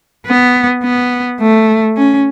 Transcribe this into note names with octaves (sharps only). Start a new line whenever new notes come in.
B3
B3
A3
C#4